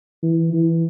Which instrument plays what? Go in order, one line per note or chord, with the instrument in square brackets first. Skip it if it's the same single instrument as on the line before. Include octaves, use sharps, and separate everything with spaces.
[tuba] E3
E3